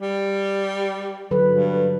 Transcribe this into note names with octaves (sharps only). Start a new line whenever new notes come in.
G3
D3 F#3 B4
G2